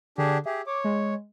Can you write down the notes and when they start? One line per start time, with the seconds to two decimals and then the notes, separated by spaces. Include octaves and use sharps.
0.18 D3 D4 G4 G#4
0.46 G4 G#4 E5
0.67 C#5 D6
0.84 G#3